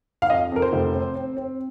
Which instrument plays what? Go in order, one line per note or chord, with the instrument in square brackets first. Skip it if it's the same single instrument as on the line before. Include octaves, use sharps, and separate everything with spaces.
[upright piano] F5
F2 D#5
F2 A#4
C5
F1
C4
C4
C4